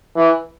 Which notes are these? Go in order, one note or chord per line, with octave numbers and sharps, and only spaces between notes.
E3